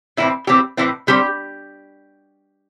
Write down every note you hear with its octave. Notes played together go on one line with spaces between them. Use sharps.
A2 E3 C4 E4
A2 E3 C4 G4
A2 E3 C4 E4
D3 G3 C4 G4